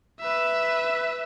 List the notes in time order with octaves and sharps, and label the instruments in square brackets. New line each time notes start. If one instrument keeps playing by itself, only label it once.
[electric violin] B4 E5